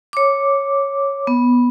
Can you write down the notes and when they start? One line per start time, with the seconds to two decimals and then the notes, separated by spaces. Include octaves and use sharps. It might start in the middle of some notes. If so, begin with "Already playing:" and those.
0.13 C#5 D6
1.27 B3